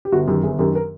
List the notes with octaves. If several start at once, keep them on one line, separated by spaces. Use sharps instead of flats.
G4
G1 F#4
F#2 D#3 G4
G1 G#4
F#2 D#3 G4
A#4